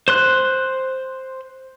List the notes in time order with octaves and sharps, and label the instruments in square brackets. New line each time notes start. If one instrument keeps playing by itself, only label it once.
[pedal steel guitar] C5 C6 F#6